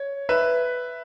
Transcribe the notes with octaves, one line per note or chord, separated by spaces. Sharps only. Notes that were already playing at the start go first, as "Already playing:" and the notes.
Already playing: C#5
B4 E5